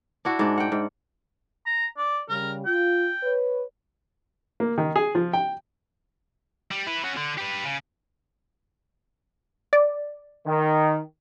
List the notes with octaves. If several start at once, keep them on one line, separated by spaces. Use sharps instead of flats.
D4 E4 F#4
G#2 D4
F#5 G5
G#2
A#5
D5
C#3 G3 A#4
F4 G5
B4 C#5
A#3
D#3
G#4
F3
G5
G3
E4 B4
C#4 F#4
D3
G4 B4
C#3
D5
D#3